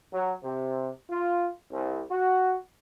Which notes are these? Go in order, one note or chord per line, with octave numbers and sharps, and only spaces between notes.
F#3
C3
F4
C2
F#4